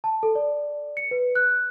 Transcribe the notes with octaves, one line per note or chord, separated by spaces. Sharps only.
A5
A4
D5
C#7
B4
F#6